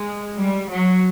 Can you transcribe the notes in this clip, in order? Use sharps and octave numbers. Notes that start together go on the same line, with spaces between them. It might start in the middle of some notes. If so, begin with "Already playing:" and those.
Already playing: G#3
G3
F#3